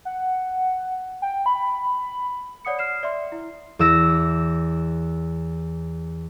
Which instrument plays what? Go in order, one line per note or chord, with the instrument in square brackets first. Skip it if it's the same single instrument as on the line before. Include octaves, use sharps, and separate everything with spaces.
[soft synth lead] F#5
G5
B5
[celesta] C#5 D5 F#5 D#6 C#7
F6 C7 E7
D5 E5 C6
E4
[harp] E2 D6 E6 A#6